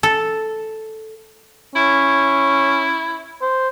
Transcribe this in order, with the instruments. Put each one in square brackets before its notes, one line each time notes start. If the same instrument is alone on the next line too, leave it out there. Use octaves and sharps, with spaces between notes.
[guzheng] A4
[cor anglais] C#4 [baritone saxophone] E4
[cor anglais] C5